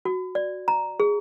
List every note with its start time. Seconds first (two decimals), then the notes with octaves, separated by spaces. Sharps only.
0.05 F#4
0.35 D5
0.68 A#5
1.00 G#4